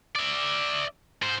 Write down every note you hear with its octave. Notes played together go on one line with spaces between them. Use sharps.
D5 E5
G#2 C5